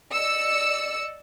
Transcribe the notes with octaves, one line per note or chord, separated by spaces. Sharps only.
D5 D#5 E6 C#7